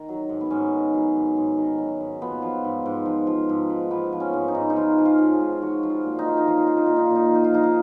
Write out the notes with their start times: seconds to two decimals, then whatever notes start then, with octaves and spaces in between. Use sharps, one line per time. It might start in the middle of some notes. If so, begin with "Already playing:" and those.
Already playing: D#3
0.09 F#3
0.29 G#2
0.41 B3
0.50 G#2 C#4
0.73 D#3
0.94 F#3
1.14 G#2
1.37 G#2
1.58 D#3
1.78 F#3
2.00 G#2
2.22 F3 B3
2.42 F3
2.64 G#2
2.86 G#2
3.06 F3
3.27 F3
3.49 G#2
3.69 G#2
3.91 F3 B3
4.13 F3
4.20 C#4
4.34 G#2
4.48 D#4
4.55 G#2
4.70 D#4
4.76 F3 F4
4.98 F3
5.05 F4
5.18 G#2
5.33 G#4
5.40 G#2
5.62 F3 F#4
5.83 F3
5.90 F4
6.04 A#2
6.19 D#4
6.25 A#2 F4
6.37 D#4
6.46 F3 F4
6.58 D#4
6.67 F3 F4
6.77 D#4
6.86 A#2 F4
6.96 D#4
7.06 A#2 F4
7.16 D#4
7.26 F4
7.31 F3 D#4
7.44 F4
7.53 F3 D#4
7.63 F4